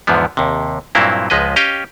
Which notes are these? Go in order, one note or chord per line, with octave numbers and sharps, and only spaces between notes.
E2 G#2 D3 F3 B3
D#2 C3
G2 A#2 F#3 A#3 C4 E4
C#2 F3 G#3 B4 D#5
C#4 G4 D#5 F5 G5